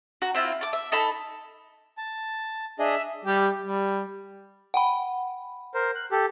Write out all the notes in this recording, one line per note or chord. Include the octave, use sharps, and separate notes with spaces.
F#4 A#5
C4 E4 F4
A5 D6
E5
D#4 A4 A5 B5
A5
D4 G#4 D#5 E5
G3 G4
G3
F#5 G5 B5
A#4 C5
F#6
G4 A4